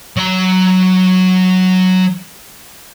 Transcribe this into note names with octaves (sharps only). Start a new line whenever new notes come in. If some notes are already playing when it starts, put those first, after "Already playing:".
F#3 A#5